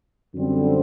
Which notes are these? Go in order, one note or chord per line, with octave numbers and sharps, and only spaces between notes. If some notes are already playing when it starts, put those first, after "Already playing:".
F#2 D3 G3 C4